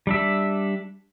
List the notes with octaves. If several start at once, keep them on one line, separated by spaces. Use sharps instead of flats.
G3 D4 E5